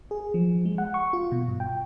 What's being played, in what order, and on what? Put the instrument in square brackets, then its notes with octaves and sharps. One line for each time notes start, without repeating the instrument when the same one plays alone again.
[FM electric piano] G#4
F3
G#3
F#5
C#6
F4
B2
G2
G5